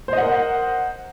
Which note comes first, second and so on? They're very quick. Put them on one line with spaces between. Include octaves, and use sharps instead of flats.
C5 D#5 F#5 A#4